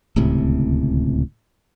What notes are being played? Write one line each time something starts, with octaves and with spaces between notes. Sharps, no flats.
D1 C#2 A2 C3